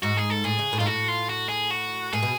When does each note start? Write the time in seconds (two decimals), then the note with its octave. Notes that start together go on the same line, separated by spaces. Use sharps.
0.02 G#2 F#4
0.17 G#4
0.30 A4
0.44 A2 G#4
0.59 C#3
0.73 A2
0.79 G#2 F4
0.86 A2 F#4
1.08 F4
1.29 F#4
1.49 G#4
1.70 F#4
2.12 A2 G#4
2.23 B2